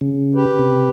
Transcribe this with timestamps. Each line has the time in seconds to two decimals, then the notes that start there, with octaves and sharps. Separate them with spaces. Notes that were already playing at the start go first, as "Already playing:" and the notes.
0.01 C#3
0.35 G4 B4
0.59 C3